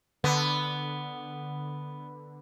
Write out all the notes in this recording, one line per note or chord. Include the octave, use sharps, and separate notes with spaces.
D3 B3